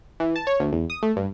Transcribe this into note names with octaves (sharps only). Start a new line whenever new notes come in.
E3
A5
C#5
D2
E2
D#6
A3
G2